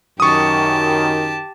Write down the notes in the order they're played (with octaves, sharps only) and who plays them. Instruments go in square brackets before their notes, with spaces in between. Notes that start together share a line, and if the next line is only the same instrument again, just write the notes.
[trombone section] F#2 D#3 [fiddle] G4 A5 [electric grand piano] C#6 D#6